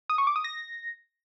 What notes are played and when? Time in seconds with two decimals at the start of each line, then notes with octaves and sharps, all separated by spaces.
0.10 D#6
0.18 C#6
0.27 D6
0.36 D#6
0.44 A#6